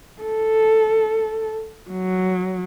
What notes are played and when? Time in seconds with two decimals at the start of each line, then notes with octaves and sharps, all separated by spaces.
0.22 A4
1.91 F#3